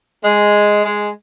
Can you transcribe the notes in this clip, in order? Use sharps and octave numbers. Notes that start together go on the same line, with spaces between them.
G#3
G#3